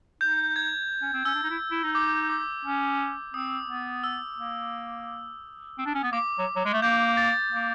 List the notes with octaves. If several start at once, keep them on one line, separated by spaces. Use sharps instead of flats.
D#4 G6
G#6
C#4
C4
C#4 E6
D4
D#4
E4
E4
D#4
D6
D6
C#4
C4 D#6
B3
E6
A#3
C4
D4
C#4
B3
A#3 D6
F#3
F#3
G#3
A3
A#3 G6
A6
A#3